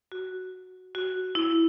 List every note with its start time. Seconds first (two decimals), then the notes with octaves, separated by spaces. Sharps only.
0.12 F#4
0.95 F#4
1.35 E4